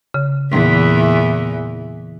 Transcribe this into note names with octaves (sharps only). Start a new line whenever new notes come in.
C#3
E2 A#2 E3